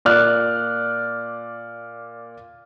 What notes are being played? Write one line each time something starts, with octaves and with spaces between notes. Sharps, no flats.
A#2 D5 F6 F#6